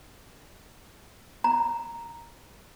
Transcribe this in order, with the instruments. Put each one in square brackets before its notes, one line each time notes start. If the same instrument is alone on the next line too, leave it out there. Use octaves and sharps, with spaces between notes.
[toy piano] A#5